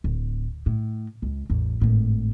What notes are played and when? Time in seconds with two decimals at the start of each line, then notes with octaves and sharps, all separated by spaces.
0.04 D1
0.66 A2
1.22 C#2
1.50 A1 E2
1.81 G#1 A2